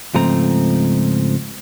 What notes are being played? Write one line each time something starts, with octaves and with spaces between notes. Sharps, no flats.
C#2 G#2 F3 A3 C4 A#5